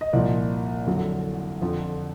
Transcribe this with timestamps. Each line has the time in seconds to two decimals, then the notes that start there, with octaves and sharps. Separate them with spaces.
0.01 D#5
0.13 C2 A#2 F3 D5
0.87 F2 D3 F#3
1.61 F2 D3 F3